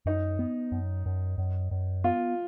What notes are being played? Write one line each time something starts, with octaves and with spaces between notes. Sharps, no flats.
F#2 D#4
B3
F#2
F#2
F#2
F#2
B3 F4